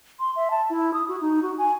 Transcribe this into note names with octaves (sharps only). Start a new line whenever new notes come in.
C6
E5
A5
E4
D#6
F#4
D#4
F#4
G#5